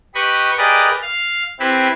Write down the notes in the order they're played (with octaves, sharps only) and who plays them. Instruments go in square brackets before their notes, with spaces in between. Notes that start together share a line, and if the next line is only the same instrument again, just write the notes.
[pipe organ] G4 B4 D#5 B5 C#6
G4 G#4 A#4 B4 D5 D#5
F5 F6
C4 E4 G4 B4